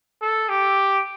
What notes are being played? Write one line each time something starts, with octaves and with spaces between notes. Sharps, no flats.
A4
G4